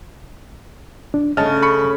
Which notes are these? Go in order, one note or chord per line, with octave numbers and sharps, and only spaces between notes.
D4
C#3 A3 D4 D#5 A5 F6
B5 C#6 C#7